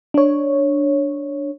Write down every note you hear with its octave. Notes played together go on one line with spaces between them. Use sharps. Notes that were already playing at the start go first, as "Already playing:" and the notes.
D4 C#5